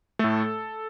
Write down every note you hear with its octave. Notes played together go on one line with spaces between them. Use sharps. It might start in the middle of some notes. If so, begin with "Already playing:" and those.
A2 A3 A4